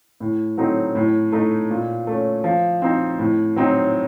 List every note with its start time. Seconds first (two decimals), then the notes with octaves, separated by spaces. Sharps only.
0.20 A2
0.58 F#3 A3 C4 D#4
0.95 A2
1.32 A3 D#4
1.70 A#2
2.07 A3 C#4
2.44 F3
2.82 C4 D#4
3.19 A2
3.56 F#3 C4 D#4